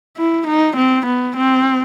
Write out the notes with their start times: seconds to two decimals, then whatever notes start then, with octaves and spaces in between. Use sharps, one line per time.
0.17 E4
0.47 D#4
0.76 C4
1.06 B3
1.36 C4